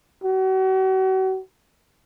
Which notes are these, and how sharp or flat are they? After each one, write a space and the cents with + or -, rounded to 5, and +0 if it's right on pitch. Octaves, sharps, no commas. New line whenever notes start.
F#4 +40